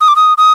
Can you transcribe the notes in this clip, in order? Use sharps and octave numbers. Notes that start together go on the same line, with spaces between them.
D#6
D6
D#6
D#6